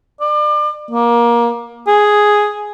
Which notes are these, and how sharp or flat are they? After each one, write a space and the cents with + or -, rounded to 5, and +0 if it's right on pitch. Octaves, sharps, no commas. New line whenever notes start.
D5 +35
A#3 +20
G#4 +0